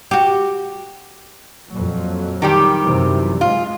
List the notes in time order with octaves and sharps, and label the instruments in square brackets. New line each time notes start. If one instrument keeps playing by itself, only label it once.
[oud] F#4 G4
[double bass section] F2 A#2 F#3
[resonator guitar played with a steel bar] D#3 G3 G4
[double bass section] F#2 C3 E3
[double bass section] G#2 G#3 [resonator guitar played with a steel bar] F4